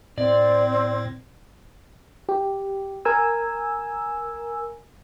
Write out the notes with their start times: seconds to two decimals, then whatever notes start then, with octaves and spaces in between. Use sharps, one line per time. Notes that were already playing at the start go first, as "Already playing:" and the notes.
0.18 A2 C4 D5
2.29 G4
3.05 A#4 G#5 E6